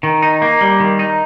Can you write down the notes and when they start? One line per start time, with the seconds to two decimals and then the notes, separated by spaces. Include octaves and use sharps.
0.03 D#3
0.22 D#4
0.42 A#3
0.61 G3
0.80 D#3
0.99 D#4